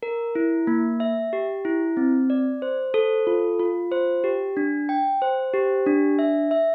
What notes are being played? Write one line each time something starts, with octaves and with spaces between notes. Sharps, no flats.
A#4
E4
A#3
E5
G4
E4
C4
D5
C5
A4
F4
F4
C5
G4
D4
G5
C5
G4
D4
E5
E5